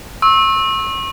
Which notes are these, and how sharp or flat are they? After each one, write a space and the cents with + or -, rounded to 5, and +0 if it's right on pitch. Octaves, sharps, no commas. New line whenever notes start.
C#6 -35 E6 -15